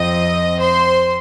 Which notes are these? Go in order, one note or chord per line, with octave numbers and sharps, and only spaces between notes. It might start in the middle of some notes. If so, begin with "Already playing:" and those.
Already playing: F2 F3 C4 D#5 D#6
C5 C6